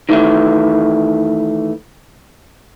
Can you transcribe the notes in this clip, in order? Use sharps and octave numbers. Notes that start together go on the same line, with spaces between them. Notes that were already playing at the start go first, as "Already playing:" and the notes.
D#3 E3 A3